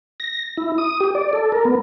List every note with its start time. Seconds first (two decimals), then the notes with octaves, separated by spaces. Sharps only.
0.20 A#6
0.57 E4
0.78 D#6
1.00 G4
1.15 D5
1.33 A4
1.52 A#4
1.65 B3